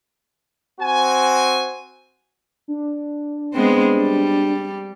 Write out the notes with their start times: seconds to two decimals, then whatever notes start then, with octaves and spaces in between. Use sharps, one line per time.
0.81 C4 F#4 G#5
2.68 D4
3.54 G#3 B3 C4
3.97 G3